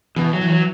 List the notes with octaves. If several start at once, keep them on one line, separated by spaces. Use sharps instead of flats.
B2 E3
F#3
E3
F#3